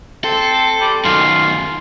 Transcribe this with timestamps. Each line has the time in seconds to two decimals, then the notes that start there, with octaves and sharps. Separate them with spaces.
0.24 C4 A4
0.80 G3
1.05 F#2 D#3 F4